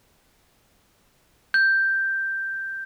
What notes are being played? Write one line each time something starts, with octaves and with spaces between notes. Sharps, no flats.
G6